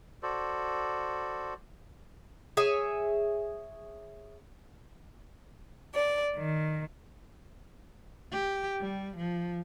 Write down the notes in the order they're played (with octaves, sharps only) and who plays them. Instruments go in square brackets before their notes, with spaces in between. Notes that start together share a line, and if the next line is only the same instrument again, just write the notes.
[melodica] F#4 A4 C5 D5
[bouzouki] G#4 C#5 E5 G#5
[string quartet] D5
D#3
[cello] G4
G3
F3